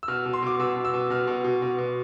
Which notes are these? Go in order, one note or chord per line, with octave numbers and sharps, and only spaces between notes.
E6
B2 F6
B2
C6
B2 D6
B2 E6
B2
E6
B2
B2 F6
B2
B2
B2
B2